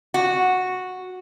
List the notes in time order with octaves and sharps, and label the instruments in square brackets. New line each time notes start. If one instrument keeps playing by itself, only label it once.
[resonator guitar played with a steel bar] F#4